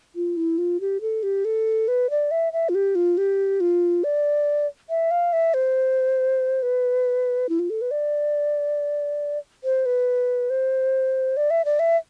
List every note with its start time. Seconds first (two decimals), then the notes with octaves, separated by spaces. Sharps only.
0.16 F4
0.37 E4
0.58 F4
0.80 G4
1.01 A4
1.23 G4
1.45 A4
1.88 B4
2.10 D5
2.31 E5
2.53 E5
2.69 F4
2.75 G4
2.95 F4
3.18 G4
3.60 F4
4.04 D5
4.89 E5
5.11 F5
5.33 E5
5.54 C5
6.63 B4
7.49 E4
7.59 F4
7.70 A4
7.81 B4
7.91 D5
9.64 C5
9.86 B4
10.50 C5
11.37 D5
11.50 E5
11.65 D5
11.79 E5